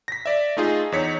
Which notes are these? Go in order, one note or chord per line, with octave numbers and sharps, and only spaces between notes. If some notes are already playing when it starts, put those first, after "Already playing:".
A#6 B6
D5 E5
A3 D#4 F4 G#4
E2 D#4 C#5 B6 C#7